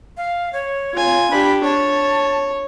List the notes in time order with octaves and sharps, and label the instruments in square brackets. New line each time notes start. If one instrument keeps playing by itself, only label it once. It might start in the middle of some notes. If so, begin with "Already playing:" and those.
[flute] F5
C#5
[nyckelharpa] F4 G#5
[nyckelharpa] D4 G4 [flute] B5
[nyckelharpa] C#5 [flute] A5